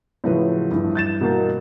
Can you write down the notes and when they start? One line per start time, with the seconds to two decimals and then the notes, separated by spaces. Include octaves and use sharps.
0.24 A2 C#3 F3 F#3 B4
0.71 G2 E3
0.95 G6 A6 E7
1.21 B2 A#3 A#4